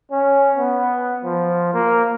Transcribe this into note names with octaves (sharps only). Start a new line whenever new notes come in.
C#4
B3
F3
A#3